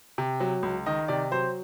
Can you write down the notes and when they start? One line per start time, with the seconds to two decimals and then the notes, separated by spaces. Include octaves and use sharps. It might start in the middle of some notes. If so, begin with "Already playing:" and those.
0.18 C3
0.40 F#3
0.63 C#2
0.86 D#3 D#5
1.08 C3 D5
1.31 F#3 C5